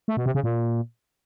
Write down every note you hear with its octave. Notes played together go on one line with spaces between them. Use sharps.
A3
B2
C3
C#3
A#2